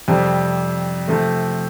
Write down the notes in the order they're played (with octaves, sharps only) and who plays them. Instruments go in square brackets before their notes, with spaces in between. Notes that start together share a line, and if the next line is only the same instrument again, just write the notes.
[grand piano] F2 C3 G3
C3 F3 A3